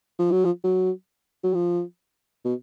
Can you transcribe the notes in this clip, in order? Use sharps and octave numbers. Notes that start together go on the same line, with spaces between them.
F3
F#3
F3
F#3
F#3
F3
B2